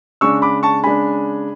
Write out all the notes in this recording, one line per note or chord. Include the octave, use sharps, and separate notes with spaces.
C#3 G#3 D4 C#6 E6
B5 D6
A5 C#6
C#3 G#3 D4 G#5 B5